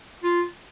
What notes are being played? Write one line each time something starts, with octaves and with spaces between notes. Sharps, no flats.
F4